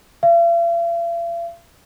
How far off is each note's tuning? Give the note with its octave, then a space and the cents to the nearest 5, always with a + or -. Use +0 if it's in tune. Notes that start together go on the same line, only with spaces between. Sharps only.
F5 -45